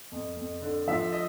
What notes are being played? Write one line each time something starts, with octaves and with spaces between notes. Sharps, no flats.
F2
F2
D3
F3 E5
D#5